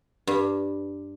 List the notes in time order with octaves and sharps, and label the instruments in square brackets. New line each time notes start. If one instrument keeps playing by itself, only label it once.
[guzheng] G2